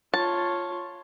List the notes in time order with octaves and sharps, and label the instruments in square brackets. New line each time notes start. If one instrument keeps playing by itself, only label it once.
[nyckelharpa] F4 C#5 [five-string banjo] A5